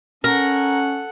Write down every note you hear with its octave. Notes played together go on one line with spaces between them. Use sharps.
C#4 A4 A#4 F#5